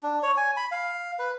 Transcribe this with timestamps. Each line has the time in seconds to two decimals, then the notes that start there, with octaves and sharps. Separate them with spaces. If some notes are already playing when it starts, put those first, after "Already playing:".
0.03 D4
0.23 C#5
0.37 G#5
0.57 B5
0.71 F5
1.19 B4